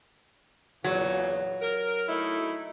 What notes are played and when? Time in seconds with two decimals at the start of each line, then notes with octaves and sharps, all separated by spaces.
0.84 E2 A#2 C#3 F#3
1.62 A#4
2.08 A3 D#4 E4